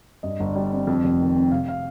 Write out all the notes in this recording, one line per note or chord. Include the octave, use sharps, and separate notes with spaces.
G2 D#5
G1
G3
C4
F2
F1
D#3
C4
C3 F5
F5